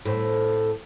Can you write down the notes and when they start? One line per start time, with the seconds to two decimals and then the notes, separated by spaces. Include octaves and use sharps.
0.05 A2 C4